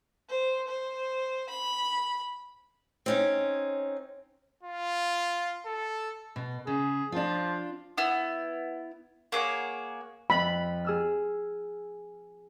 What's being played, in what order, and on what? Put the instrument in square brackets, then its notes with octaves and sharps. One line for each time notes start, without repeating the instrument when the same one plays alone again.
[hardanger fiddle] C5
C5
B5
[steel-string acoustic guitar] C4 C#4 D#4
[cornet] F4
A4
[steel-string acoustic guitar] B2
[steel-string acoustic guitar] C#3 [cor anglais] G#4
[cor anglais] F3 [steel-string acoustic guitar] D4 F4
[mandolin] B3 E4 D#6
A#3 G#4 C#5 F#5
[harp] F2 [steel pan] B5
[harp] G#4 E6 F6